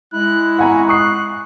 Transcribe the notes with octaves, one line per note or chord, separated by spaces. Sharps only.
G#3 E4 F#6
F#5 G#5 A#5 C#6
C#6 D#6 F#6 C7